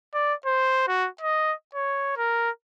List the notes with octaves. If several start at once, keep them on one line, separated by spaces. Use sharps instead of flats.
D5
C5
F#4
D#5
C#5
A#4